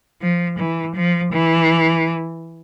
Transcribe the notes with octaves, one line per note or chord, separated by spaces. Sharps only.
F3
E3
F3
E3